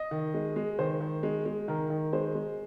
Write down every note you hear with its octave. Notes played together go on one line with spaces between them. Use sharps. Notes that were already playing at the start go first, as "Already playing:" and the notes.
Already playing: D#5
D#3
G#3
G#3
D#3 C5
D#3
G#3
G#3
D#3 A#4
D#3
G#3 C5
G#3